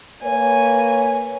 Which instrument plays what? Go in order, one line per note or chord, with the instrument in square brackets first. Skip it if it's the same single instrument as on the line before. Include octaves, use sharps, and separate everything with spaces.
[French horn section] A#3 B4 C#5 [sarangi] G#5